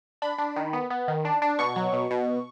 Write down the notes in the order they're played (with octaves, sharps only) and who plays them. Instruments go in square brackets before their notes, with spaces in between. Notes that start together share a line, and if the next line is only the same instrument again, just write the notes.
[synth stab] D4 B5
D4
D#3
B3
B3
D#3
D4
D4
B2 C#6
F#3
B2
B2